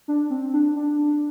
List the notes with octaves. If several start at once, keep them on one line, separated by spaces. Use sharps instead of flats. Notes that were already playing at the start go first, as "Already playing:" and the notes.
D4
C4
D4
D4